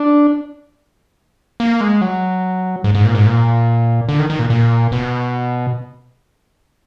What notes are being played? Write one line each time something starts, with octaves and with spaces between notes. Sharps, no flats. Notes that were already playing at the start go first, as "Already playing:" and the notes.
Already playing: D4
A#3
G#3
F#3
G#2
G#2
A#2
G#2
A#2
D3
D#3
D#3
A#2
A#2
B2